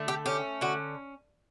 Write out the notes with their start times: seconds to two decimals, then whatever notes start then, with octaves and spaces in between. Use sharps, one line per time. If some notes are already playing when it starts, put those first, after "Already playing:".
Already playing: D3 A3
0.08 G4
0.26 C#4 G4
0.61 D3 F#4